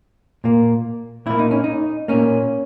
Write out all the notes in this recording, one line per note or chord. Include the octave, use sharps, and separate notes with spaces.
A#2 A#3
A#2 A#3 E4
D#4
C#4
D#4
A#2 A#3 C#4